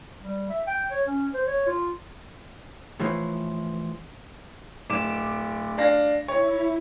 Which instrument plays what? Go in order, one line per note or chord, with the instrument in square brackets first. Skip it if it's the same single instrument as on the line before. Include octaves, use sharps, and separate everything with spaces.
[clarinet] G3
E5
G5
C#5
C#4
C5
C#5
F4
[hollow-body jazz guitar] A2 E3 F3
[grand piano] D1 D6 E7
D4 F5 A#6
[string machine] E4 [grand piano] C#5